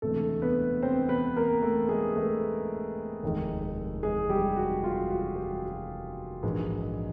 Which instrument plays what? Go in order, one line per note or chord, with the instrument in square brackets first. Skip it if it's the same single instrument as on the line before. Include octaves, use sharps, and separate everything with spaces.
[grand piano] E1 D2 C3 E3 G#3 A3 A4
B3 B4
C4 C5
B3 B4
A#3 A#4
A3 A4
G#3 G#4
A3 A4
F1 D#2 D#3 G#3
G#3 G#4
G3 G4
F#4
F4
F#4
G3 G4
F#4
A#1 G#2 E3 G#3